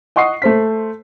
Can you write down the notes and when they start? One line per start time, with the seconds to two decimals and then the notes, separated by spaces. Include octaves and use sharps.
0.16 D#5 F#5 C#6 D#6 C7
0.42 A3 C5 B6